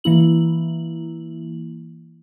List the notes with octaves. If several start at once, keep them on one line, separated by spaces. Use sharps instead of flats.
E3 A#3 E4 F#7